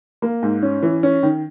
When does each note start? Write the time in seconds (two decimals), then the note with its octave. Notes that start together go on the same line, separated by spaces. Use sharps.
0.22 A#3
0.43 G#2
0.62 C#4
0.83 E3
1.03 C#4
1.23 D#3